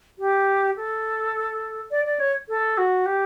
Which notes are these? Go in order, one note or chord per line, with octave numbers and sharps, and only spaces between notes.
G4
A4
D5
D5
C#5
A4
F#4
G4